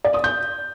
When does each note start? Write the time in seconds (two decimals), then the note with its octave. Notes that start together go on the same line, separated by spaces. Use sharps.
0.05 D5
0.14 D#6
0.24 G6